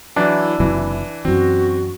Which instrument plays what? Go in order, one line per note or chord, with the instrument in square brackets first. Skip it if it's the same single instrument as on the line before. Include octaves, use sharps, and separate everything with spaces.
[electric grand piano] E3 F#3 [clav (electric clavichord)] D4 [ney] E4
[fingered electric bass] F#1 C3 F#3 [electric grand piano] E3
[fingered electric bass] F#2 E3 [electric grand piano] C4 [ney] F#4